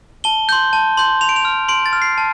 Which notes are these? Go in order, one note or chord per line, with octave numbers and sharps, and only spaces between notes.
A5 G7
C6 G6
A5
C6 G6
C6 F7
D7
F7
F6
C6 D7
A6
F6
C7
A5